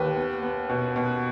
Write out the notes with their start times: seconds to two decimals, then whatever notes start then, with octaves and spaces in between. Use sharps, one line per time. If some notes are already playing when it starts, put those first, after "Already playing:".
Already playing: D#2 G4 B4
0.16 B3
0.43 B3
0.69 B2
0.96 B2